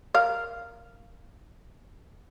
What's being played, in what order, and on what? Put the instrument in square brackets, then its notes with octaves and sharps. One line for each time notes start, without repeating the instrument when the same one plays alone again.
[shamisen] A#4 F5